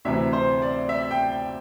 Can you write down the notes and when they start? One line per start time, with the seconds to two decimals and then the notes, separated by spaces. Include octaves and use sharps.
0.05 D2 C3 E3 E5
0.33 C5
0.62 D5
0.89 E5
1.11 G5
1.31 G5